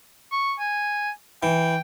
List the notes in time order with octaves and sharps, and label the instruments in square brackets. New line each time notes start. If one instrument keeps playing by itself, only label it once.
[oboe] C#6
G#5
[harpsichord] E3 [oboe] G5